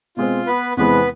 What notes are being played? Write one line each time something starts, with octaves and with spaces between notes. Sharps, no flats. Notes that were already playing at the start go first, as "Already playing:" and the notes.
B2 G#3 C4 F4
B3 B4
E2 C3 E3 G#3 B3 C4 B4